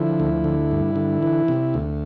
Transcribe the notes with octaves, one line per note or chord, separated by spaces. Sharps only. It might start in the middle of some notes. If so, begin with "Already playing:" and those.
Already playing: D3 F3 E4
D2
D3
G2
D3
E3
C3
D2